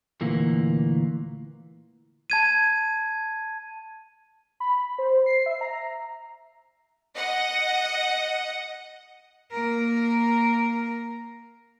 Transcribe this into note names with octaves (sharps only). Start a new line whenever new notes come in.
D2 A#2 E3 A#3
A5 G#6 D#7
B5
C5
C7
E5
A#5
D#5 F#5
A#3 A#4